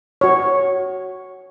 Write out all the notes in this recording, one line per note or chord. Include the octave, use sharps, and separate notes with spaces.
F#4 C#5